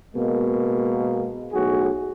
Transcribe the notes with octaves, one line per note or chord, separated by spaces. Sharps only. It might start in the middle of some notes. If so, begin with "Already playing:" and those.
B2 G#3 A#3
B1 A2 F#4 G#4